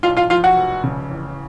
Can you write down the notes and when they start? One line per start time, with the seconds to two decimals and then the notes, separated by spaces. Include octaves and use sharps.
0.03 B1 F4 F5
0.17 F4 F5
0.30 F3 F4 F5
0.44 F#4 F#5
0.57 F1
0.84 C#3
1.10 A1